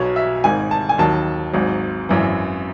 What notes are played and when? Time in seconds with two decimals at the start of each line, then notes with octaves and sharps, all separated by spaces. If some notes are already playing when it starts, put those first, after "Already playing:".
Already playing: B1 B2 F#3 C#5
0.16 E5
0.44 G#1 G#2 D#3 G#5
0.71 A5
0.89 G#5
0.98 D#2 D#3 F#3 A5
1.53 G#1 G#2 F#3
2.09 G#1 F#2 E3